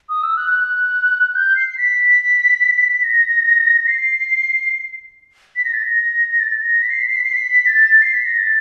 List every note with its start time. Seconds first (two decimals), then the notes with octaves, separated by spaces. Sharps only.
0.09 D#6
0.23 E6
0.37 F#6
0.51 F#6
1.35 G6
1.56 C7
1.78 B6
3.03 A#6
3.87 C7
5.56 B6
5.65 A#6
5.73 A6
5.83 A#6
6.29 A#6
6.40 A6
6.62 A#6
6.82 B6
6.90 C7
6.99 B6
7.08 C7
7.16 B6
7.24 C7
7.33 B6
7.66 A6
8.02 C7
8.14 B6
8.26 A#6
8.38 A6